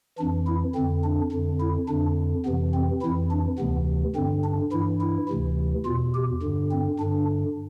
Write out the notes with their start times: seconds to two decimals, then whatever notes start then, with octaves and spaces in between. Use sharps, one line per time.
0.19 F2 E3 D4
0.47 E4
0.75 F2 D3 C4
1.04 D4
1.32 F2 D3
1.60 E4
1.88 F2 D3 D4
2.45 F2 C3 E3 B3
2.74 C4
3.02 F2 E3 E4
3.31 D4
3.59 D2 C3 E3 B3
4.15 G2 D3 C4
4.44 D4
4.72 G2 E3 E4
5.01 E4
5.29 D2 C3 E3
5.85 E2 B2 F4
6.14 G4
6.42 G2 D3
6.71 C4
6.99 G2 D3 D4